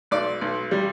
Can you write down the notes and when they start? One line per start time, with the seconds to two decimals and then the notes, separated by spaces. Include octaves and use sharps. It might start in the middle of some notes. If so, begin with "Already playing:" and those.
0.11 B1 D5
0.41 B1
0.71 G3